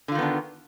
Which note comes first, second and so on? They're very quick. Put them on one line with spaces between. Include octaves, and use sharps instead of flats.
D3 F4 D#3 B3 D4